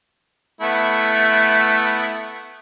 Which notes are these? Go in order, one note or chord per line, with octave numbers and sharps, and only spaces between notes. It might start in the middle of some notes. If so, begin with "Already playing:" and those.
A3 B3 E4